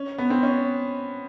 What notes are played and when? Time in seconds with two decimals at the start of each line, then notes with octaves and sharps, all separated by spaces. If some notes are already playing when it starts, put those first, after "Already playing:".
Already playing: C#4
0.18 B3
0.30 C4
0.43 C#4